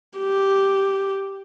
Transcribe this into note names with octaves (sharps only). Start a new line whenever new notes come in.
G4